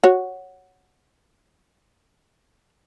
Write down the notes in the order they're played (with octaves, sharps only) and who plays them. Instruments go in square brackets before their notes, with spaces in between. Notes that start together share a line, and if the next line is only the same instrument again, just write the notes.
[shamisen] F#4 C#5